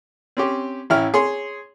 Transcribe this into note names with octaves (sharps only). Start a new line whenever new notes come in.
C4 C#4 G4
A1 C#4 E4 G5 F6
G#4 C#5 C6